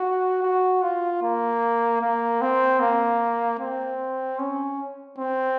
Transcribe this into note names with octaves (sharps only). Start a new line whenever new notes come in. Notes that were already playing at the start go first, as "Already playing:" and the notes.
Already playing: F#4
F#4
F4
A#3
A#3
C4
A#3
C4
C#4
C4